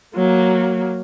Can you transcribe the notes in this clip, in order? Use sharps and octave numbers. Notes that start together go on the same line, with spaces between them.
F#3 A#3